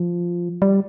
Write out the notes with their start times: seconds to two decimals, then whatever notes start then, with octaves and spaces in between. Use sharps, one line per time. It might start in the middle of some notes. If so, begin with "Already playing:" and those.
Already playing: F3
0.62 G3